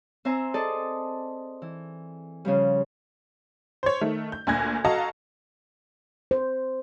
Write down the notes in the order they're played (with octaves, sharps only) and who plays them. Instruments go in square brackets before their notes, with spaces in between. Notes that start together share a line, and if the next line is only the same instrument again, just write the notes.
[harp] C4 C5 E5 G#5 A#5
G#4 A4 D5 D#5 A5
E3
C#3 F3 G3
[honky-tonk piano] C5 C#5
D#3 A3
G6
D2 A#2 G#5 F#6 G#6 A#6
F#4 A4 D#5 F5 A5 A#5
[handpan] C5